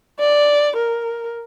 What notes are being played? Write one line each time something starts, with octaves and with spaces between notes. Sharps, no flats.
D5
A#4